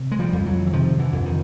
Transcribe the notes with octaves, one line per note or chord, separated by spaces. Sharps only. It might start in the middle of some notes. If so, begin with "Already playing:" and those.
Already playing: C3
G#3
F3 G3
F2
E3 F#3
E3
C3 D#3 F3
D3 E3
F2
D#3